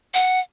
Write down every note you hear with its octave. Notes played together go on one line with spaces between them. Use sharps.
F#5